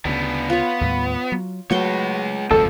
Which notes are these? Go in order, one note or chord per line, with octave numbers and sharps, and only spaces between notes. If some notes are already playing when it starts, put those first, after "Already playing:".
D2 C#3 B3 D4
B3 F4 C#5
D#2 A2 G3
F#3
F#3 G#3 A3 F#4 B4 C#5 G5
E1 C#2 F#2 F3 C4 A4